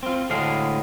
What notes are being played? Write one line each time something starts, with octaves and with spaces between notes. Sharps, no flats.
C4 F4
D2 A2 D3 G#3 F5